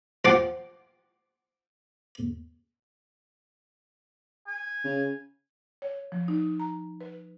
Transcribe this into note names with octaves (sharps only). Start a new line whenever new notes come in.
F3 F4 F#5 G5 D6
G#5
C#3
C#5
F3
D#4
A#5
B4